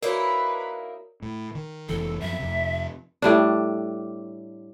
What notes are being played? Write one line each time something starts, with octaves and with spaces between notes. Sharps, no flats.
A#3 D#4 E4 F#4 A#4 B4 C#5 D5
A2
D#3
F1 E3 A4
F#2 F3 E5
F2 C3
A2 G3 D4